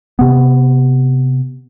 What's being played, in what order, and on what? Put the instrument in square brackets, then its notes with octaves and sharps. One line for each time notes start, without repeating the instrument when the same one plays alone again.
[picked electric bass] C3 B3